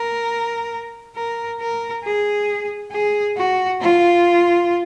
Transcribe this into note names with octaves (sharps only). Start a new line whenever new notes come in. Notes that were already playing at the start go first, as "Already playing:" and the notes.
Already playing: A#4
A#4
A#4
G#4
G#4
F#4
F4